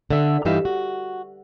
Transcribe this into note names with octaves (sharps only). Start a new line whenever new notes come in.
D3 E5
G2 E3 D#4 G4 E5 F5
F#4